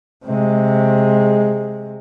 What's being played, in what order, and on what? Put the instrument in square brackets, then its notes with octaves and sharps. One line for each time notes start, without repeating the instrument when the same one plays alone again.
[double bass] C3 G#3